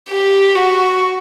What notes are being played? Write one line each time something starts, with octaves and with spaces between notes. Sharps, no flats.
G4
F#4